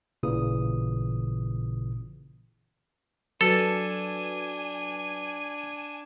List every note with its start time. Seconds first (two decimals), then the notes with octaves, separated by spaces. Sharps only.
0.23 A1 A#2 C#3 E3 D#6
3.41 F#3 D4 F#4 A4 B4 G#5